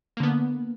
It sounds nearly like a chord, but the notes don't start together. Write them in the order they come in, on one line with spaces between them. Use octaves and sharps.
A#3 D3 B3